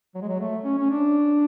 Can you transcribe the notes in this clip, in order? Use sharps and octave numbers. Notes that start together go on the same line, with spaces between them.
F#3
G#3
F#3
A3
C#4
C#4
D4